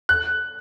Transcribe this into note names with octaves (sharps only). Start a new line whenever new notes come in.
F#6